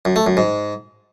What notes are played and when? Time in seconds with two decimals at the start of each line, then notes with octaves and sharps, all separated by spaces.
0.05 F#2
0.16 A3
0.27 F#2
0.37 G#2